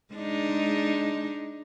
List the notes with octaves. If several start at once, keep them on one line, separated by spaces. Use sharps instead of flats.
G#3 D4 D#4